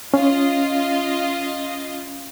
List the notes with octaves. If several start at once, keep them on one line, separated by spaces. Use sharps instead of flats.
C#4 F4 D#5